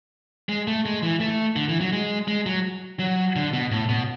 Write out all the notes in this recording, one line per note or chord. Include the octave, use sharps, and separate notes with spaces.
G#3
A3
G#3
E3
A3
D3
E3
F#3
G#3
G#3
F#3
F#3
D3
B2
A2
B2